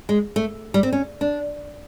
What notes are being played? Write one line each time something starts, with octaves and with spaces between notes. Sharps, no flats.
G#3
A3
G3
C4
C#4
D4